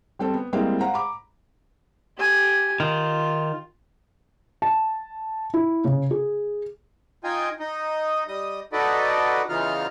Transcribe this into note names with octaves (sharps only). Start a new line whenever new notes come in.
G3 C4 A4 C5
B3
G3 G#3 A#3 C4 E4 D#5
C5 F5 F#5 A#5
A#5 B5 D6
G4 G#5
D#3 F4
A5
E4
C#3
G#4
D#4 F4 D#5 G5 G#5
D#4 D#5
G3 D#5 D#6
D#4 F#4 A4 B4 D5 D#5
E2 C#3 E3 D#4 F4 F6